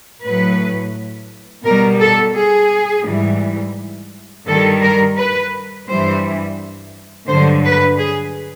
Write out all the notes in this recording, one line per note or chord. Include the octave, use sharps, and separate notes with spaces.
A2 F#3 B4
B2 G3 A#4
A4
G#4
G#2 E3 G3
G2 D#3 G3 A4
A#4
B4
G2 E3 G3 C5
G2 D3 F#3 C5
B4
G#4